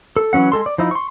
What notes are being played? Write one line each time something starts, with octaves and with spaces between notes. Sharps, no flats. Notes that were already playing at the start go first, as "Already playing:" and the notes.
A4
E3 F#3 C#4 F#5
G#3 A4 C6
D5
F3 D#4 E4
C6 C#6